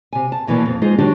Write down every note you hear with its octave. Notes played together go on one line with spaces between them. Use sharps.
C3 G#5
A5
E2 B2 E3 F3 A#3
F2
G#3 D#4 F4 G#4 C5
D#3 F#3 D4 F#4 G4